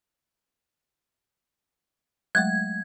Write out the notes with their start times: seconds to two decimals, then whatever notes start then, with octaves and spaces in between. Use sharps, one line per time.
2.35 F#3 G#3 A3 G#6